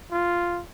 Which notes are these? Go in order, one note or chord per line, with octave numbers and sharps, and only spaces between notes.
F4